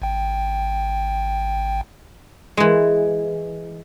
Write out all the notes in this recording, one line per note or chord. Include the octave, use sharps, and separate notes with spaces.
G#1 G5
E3 G#3